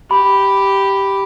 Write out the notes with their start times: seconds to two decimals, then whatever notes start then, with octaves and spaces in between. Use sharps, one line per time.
0.11 G4 B5